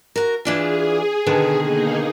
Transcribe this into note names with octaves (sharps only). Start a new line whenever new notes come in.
F#4 A#4
E3 D4 F4 G#4
B2 D3 D#3
A#3 D#4 G#4